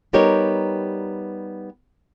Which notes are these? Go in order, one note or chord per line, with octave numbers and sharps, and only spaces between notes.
G3 B3 D#4 G4 A#4 C#5